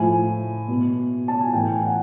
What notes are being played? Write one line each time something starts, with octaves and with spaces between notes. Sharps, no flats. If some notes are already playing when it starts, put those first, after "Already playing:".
Already playing: A2 F3 G#5
B2
A5
G#5
A2 E3 G5
G#5
F#5